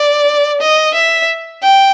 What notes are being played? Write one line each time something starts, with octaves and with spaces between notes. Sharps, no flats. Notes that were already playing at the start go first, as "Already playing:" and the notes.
Already playing: D5
D#5
E5
G5